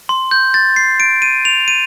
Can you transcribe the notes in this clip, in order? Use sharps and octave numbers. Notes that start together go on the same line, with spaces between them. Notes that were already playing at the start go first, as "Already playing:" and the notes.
C6
G6
A6
C7
D7
D#7
F7
D#7